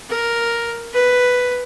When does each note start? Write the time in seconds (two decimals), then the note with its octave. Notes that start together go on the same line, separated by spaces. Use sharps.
0.10 A#4
0.94 B4